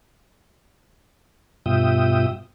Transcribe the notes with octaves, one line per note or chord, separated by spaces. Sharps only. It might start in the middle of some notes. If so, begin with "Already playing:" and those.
G2 B2 F4 E5 G5 D#6